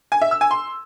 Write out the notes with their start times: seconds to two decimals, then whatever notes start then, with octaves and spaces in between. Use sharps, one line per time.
0.12 G#5
0.21 E5
0.31 E6
0.41 G#5
0.51 C6